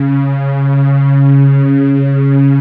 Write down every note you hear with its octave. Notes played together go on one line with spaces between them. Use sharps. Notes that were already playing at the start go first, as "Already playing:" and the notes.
Already playing: C#3
C#3